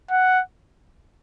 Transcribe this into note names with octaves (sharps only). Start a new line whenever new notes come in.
F#5